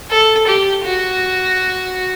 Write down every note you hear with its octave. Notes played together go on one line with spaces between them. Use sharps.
A4
G4
F#4